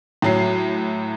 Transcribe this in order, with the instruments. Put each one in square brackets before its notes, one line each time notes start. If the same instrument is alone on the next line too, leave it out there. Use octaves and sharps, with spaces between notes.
[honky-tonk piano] A2 F#3 C7